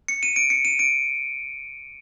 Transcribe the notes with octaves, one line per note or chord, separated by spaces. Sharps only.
C#7
D#7
D7
C#7
D#7
D7